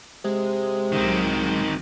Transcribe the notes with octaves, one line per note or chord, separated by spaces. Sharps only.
C3 G#3
C2 D#3 F#3 C4